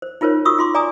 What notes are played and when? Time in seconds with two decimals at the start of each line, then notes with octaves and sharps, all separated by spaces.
0.02 C5
0.21 D#4 F4 A#4 C5 C#5
0.45 F4 F#4 C#6 D#6 E6
0.59 F4 C6 D6
0.75 D5 G#5 A#5 D6 D#6